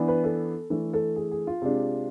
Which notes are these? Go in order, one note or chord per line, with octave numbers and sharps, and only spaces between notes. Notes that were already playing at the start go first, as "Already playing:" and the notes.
Already playing: E3 B3 D4
B4
A4
E3 A3 D4 A4
A4
G#4
G#4
F4
C3 G#3 D4